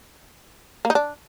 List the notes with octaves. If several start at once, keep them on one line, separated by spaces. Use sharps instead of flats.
A#3
D#4
D4